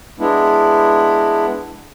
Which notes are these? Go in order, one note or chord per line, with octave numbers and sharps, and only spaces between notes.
G#3 B3 D4 E4